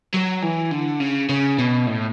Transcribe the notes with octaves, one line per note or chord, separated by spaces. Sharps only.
F#3
E3
D3
C#3
C#3
B2
A2